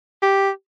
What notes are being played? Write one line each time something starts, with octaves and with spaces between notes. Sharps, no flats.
G4